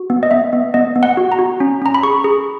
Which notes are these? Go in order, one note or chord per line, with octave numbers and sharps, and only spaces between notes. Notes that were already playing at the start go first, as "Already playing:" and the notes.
Already playing: F#4
B3
D#5
B3 E5
B3
B3 D#5
B3
F#5
F#4
A#5
F#4
C#4
C#4 A#5
B5
G#4 C#6
G#4